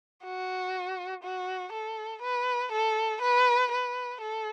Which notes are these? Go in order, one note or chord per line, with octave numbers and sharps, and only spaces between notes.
F#4
F#4
A4
B4
A4
B4
B4
A4